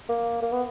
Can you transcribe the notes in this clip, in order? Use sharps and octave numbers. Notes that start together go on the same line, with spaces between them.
A#3
A#3
B3